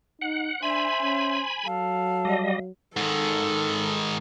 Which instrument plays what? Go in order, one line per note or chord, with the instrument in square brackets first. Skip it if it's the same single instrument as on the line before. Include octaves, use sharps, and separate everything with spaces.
[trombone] D#4 [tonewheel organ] F#5
[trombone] D4 [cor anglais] C5 [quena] E5 [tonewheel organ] G#5 B5
[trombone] C#4
[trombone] F#3 [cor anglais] A4 [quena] F5
[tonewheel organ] G3 D#5
[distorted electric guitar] G#2 D#3 [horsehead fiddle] A4